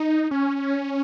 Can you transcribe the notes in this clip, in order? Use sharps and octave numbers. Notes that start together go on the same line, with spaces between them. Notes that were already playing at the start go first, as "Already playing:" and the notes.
Already playing: D#4
C#4